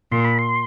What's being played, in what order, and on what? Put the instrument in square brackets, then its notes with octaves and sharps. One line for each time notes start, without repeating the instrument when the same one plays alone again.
[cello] A#2 [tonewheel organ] C6
[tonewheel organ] B5
C6